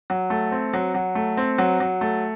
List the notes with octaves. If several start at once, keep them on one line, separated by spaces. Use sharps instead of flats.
F#3
A3
C4
F#3
F#3
A3
C4
F#3
F#3
A3